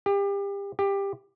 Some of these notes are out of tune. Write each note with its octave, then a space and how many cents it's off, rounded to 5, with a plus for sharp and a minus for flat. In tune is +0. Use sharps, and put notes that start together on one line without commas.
G4 +30
G4 +15